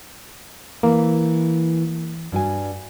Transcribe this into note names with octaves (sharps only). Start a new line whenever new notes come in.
E3 A#3
G2 F#4 G#5